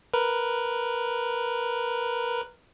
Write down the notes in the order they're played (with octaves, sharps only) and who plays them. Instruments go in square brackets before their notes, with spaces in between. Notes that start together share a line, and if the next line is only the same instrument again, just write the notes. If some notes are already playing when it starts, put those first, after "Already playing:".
[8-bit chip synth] A#4 B4